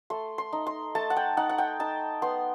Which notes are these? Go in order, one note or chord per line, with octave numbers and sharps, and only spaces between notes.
A3 C6
C6
D#4
C6
A3 A5
F#5
G5
D#4 F#5
F#5
G5
D#4 A5
B3 C6